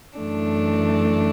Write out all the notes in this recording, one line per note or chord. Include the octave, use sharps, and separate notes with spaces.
F#2 E3 A3 D4